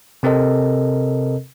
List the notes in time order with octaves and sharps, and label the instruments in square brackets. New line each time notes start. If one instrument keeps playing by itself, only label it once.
[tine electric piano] C3 C4 A4 A#4 D#5